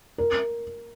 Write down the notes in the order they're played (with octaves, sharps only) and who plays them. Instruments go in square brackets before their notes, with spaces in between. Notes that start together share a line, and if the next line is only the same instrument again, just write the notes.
[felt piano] A#4